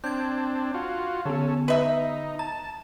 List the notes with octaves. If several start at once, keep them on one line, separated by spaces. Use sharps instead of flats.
C4 D4 G6 G#6
F4 F#4
D3 B3 C#4 A4
D#4 B4 E5
A5 A#5